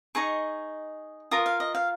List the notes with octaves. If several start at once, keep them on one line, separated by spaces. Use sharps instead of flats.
D#4 G#4 D#5 C#6
F4 A#4 D#6
F5
D#5
F5